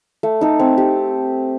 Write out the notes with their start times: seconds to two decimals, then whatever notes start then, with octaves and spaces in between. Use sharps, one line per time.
0.23 A3
0.41 D#4 A4
0.59 C4
0.78 G4